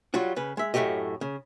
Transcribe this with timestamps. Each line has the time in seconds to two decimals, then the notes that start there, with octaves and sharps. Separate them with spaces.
0.14 F#3 G3 F4 F#4
0.36 C#3 B4
0.57 G#3 E5
0.74 F#2 A2 F3 A3 G4 D#5
1.21 C#3